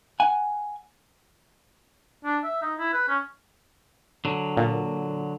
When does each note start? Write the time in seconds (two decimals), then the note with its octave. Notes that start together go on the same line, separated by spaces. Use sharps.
0.20 F#5 G#5
2.25 D4
2.44 E5
2.62 D#4
2.79 E4
2.93 B4
3.09 C#4
4.25 D3 F#3
4.57 A#2